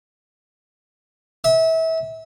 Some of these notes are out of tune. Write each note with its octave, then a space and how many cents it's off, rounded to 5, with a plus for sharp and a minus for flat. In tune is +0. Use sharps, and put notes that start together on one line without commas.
E5 -30